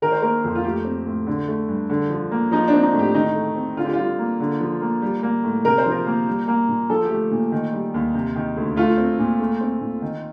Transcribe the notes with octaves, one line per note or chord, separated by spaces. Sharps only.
D#3 A#4
C5
A#3 A#4
F2
F4
A3 G4
C4
A2
D3
A3
G2
D3
F3
A#3
F3 D#4
D4
C4
D#4
A2
G4
D#3 D#4
A3
C4
D3 F4
G4
G3 F4
A#3
D3
F3
A#3
G3
A#3
A2
C3 A#4
C5
F3
A#4
A#3
G3
A#3
A#2
F3 A4
G4
A3
A#2
D#3
G3
D#2
C3
D#3
D2
A3 F4
C4
A#2
A3
C4
A#2
D#3